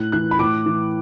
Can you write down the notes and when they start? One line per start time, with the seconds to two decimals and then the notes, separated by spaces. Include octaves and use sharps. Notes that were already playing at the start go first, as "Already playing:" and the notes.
Already playing: A2 F#6
0.12 E3 F#6
0.31 B5
0.39 A2 D6
0.66 E3